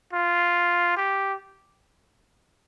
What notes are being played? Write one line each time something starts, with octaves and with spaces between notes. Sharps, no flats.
F4
G4